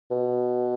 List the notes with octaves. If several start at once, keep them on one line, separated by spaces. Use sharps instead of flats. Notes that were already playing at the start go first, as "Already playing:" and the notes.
B2